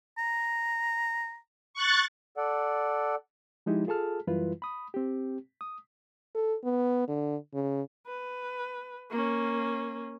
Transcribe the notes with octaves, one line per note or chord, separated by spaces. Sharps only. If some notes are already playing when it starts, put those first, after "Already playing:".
A#5
C#6 F#6 A6
A4 D5 F#5
F3 G#3 D#4 E4 G4
F4 G#4 A4 A5 F6
F#2 E3 G3 E4 F4 B4
B5 D#6
C4 G4
D#6
A4
B3
D3
C#3
B4
A#3 C#4